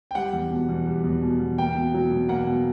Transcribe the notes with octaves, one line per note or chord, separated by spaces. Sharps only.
G5
G3 F#5
E2
B2
E2
G3
E2
B2
E2
A#3 G5
B2
F#3
B2
A#3 F#5
B2